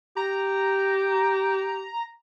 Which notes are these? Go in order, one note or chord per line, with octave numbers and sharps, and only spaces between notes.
G4 A#5